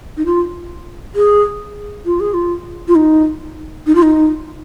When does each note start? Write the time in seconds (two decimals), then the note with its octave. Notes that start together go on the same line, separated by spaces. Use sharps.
0.17 D#4
0.26 F4
1.15 G#4
2.06 F4
2.20 G#4
2.34 F4
2.88 F4
2.95 D#4
3.87 D#4
3.95 F4
4.02 D#4